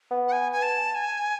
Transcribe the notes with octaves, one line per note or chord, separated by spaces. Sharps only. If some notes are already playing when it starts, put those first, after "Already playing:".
B3
F#5
G#5
G#5
A5
G#5